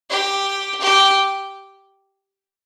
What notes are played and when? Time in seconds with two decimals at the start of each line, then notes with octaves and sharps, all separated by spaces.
0.10 G4
0.81 G4